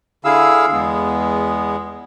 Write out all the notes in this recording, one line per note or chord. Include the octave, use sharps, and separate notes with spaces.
D3 E4 G#4 F5 E6
E2 G#3 B3